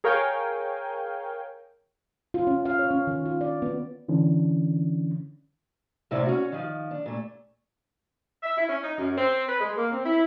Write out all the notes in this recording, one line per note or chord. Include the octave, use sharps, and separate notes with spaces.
G#4 A#4 C#5 F5 G5 G#5
F4
C#4
F5
C#5
C#4
D#3
F4
D5
B3
D3 E3 C#4 D4
F#2 A2 C3 E4 D5
C#4 F#4
D#3 F3
D4
A#2 A3
E5
E4
C#4
D#4
F#2
C4
B4
G#3
A#3
C4
E4